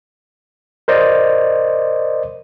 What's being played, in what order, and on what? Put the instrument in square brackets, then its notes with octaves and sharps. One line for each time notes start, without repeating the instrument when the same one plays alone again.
[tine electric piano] A#4 C5 D5 D#5